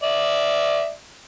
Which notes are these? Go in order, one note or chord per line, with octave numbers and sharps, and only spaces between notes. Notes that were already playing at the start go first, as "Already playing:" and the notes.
D5 E5